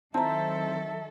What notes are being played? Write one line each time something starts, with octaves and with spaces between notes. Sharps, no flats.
D#3 F#3 C4 E4 A4 E5 A5 A#5